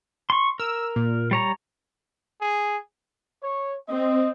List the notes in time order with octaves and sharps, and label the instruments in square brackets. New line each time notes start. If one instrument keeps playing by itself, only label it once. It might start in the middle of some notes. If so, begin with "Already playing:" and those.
[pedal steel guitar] C6 C#6
[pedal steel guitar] A#4 [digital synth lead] E6
[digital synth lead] A#2
[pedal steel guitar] G3 C#5 A#5
[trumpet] G#4
[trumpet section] C#5
[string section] C4 [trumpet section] D#5